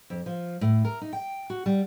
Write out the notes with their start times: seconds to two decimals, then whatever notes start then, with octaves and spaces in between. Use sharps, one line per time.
0.10 F2
0.26 F3
0.61 A2
0.85 A#4
1.01 D#4
1.13 G5
1.50 F#4
1.66 G3